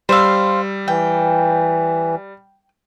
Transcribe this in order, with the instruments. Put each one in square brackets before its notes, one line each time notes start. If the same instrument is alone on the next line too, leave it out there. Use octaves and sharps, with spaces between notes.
[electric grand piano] G3 E6 [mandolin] C5 F5
[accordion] E3 [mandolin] G5